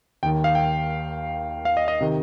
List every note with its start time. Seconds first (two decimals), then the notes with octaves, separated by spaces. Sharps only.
0.23 D#2 D#3 G5
0.44 F5
0.55 G5
1.65 F5
1.77 D#5
1.88 D#5
2.01 C3 D#3